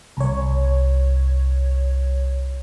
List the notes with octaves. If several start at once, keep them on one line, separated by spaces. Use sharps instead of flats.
C2 C#5